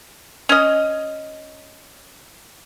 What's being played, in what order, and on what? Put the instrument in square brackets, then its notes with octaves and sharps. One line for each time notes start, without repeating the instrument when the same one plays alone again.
[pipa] C#4 D#5